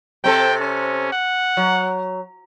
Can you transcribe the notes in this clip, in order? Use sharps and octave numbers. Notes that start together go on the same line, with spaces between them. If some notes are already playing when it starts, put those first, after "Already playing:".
C3 C4 A4 G5
C#4
F#5
F#3